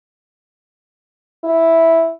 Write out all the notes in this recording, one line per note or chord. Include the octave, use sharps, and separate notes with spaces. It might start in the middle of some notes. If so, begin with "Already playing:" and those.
E4